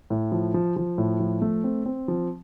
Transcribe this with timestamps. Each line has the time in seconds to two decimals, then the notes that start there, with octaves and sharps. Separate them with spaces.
0.10 A2
0.32 F3
0.54 F3
0.76 F3
0.98 A2
1.20 F3
1.42 A3
1.64 C4
1.85 C4
2.08 F3